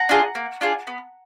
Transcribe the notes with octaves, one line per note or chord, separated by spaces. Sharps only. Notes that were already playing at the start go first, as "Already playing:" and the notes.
Already playing: F#5 A#5
D4 F4 G#4
A#3
D4 F4 G#4
B3